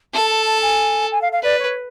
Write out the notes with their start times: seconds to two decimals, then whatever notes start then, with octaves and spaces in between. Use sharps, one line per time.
0.14 A4 A5
0.30 A5
0.45 A5
0.62 G#5
1.11 G#5
1.21 F5
1.32 F5
1.43 B4 D5
1.59 C#5